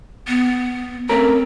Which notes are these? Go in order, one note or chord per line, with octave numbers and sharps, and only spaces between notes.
B3
A3 C4 C#4 A#4